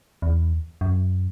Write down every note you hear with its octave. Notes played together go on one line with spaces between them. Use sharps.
E2
F#2